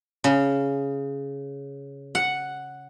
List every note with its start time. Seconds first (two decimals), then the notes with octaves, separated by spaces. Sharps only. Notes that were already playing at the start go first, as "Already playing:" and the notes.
0.24 C#3
2.15 F#5